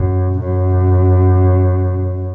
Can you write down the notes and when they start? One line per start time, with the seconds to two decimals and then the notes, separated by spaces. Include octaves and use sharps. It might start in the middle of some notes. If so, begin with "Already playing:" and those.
Already playing: F#2
0.39 F#2